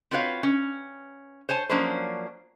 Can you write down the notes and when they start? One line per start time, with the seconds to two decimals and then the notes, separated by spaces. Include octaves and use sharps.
0.11 C4 F4 F#4 B4 C#5 F5
0.43 C#4
1.49 C5 C#5 G#5 A5
1.69 F3 F#3 A#3 C#4 D4 C5